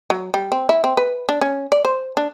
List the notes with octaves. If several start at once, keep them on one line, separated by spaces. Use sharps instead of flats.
F#3
G3
C4
E4
C4
B4
D4
C#4
D5
C5
D4